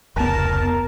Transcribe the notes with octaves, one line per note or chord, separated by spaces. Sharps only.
F1 C#2 B3 A#4 A5